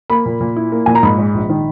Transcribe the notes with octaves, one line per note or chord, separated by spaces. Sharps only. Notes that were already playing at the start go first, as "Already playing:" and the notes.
A#3 B5
A#2
A#2
E4
A#3
A#2 G#5
A#5
G#2 B5
G#3
A#1
D#3